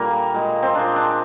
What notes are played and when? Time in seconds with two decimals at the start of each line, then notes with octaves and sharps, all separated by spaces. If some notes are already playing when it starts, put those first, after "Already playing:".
Already playing: A#2 D3 G3 A#3 A#4
0.34 A#2 G#3
0.62 C4
0.74 A#2 G#3 D4
0.96 D4